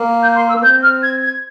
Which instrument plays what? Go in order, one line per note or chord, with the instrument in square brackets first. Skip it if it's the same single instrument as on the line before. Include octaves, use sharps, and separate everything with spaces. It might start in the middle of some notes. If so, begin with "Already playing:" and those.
Already playing: [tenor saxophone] A#3
[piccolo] G6
C6
E6
[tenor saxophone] A#3
[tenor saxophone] C4 [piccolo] G6
[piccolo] F6
G#6
G#6